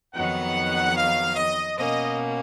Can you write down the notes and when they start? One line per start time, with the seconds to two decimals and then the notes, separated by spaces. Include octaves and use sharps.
0.15 F2 D#3 F#3 B3 D#4 F#5
0.96 F5
1.36 D#5
1.77 B2 A#3 C#4 D#5